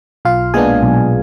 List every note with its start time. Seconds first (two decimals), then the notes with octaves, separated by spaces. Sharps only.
0.25 B1 F4 F5
0.54 A#2 G#3 B3 D4 G#4 G#5
0.83 B1